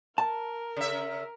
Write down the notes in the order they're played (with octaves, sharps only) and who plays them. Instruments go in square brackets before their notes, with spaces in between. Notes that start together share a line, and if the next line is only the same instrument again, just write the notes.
[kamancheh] A#4 [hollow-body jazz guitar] A5
[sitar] C#3 E5